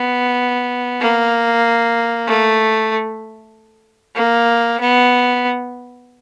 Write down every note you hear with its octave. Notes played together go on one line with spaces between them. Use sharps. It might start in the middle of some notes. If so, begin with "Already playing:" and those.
Already playing: B3
A#3
A3
A#3
B3